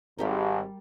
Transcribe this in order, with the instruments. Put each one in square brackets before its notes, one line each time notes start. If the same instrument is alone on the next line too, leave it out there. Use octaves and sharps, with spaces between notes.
[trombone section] G#1 [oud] G3 G4 A#4